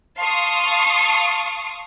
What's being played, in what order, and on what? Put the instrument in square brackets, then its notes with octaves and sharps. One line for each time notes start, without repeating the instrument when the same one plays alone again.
[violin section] F5 A5 C6 C#6 D#6